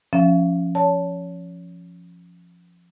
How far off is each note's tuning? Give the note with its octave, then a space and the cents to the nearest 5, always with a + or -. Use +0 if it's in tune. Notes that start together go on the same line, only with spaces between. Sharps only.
F3 -5 C#4 +0 E5 +45
C#5 +30 A5 +0